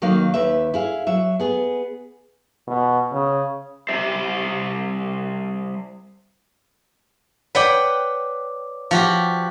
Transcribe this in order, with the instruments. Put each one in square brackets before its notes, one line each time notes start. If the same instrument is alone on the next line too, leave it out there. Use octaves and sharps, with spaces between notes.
[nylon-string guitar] D#3 F#3 A#3 D#5 F5
D#2 B4 E5
E4 G#4 F5
F#3 E5
B3 G#4
[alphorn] B2
C#3
[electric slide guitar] G3 G4 C5 E5
[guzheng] B4 F#5 G5 [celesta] C#5 D5 D6
[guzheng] F3 F#4 G4